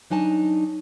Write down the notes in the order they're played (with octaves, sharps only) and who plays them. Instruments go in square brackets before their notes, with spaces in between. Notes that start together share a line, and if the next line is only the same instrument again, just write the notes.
[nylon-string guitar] F#3 D4 D#4 G#5 A5